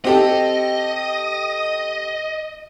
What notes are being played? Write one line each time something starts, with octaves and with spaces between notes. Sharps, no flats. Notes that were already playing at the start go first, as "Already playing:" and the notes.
C4 G4 A4 D#5